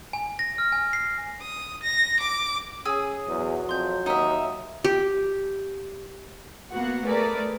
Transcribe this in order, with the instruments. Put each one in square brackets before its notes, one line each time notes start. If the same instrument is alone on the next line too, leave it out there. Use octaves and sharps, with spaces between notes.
[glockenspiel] G#5
A#6
F6
G#5
C7
[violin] D#6
A#6
D6
[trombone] C#4 [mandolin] G#4 [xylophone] G#5 E6
[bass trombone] E2 [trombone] F#3
[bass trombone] F2 [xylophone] C6 G6
[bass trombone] D#2 [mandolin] D#4 E5 [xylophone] F#5 D#6
[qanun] G4
[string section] A#3 B3 F#4 F#5
A3 G#4 A#4 B4 D5